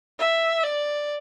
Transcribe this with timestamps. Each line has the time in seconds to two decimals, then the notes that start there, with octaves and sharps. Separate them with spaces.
0.19 E5
0.63 D5